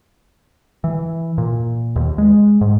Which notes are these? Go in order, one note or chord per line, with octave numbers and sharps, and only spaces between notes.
E3
A#2
D#2
G#3
G#2